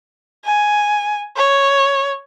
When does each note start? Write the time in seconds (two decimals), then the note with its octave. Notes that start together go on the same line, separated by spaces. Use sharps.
0.45 G#5
1.37 C#5